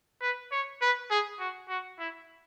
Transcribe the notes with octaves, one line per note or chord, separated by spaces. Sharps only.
B4
C#5
B4
G#4
F#4
F#4
E4